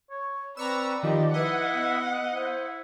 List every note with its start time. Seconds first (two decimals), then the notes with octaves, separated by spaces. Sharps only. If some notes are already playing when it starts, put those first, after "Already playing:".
0.10 C#5
0.57 C4 B4 D5 A#5 C#6 E6
1.03 D#3 F3 G4 D#5
1.34 E4 B4 D#5 F#5
1.73 B3
2.32 E4 C5